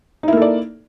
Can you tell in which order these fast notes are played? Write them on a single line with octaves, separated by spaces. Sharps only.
D#4 E4 A#3 A4 D5